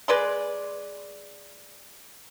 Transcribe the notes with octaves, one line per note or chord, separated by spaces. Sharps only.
G#3 B4 D5 C6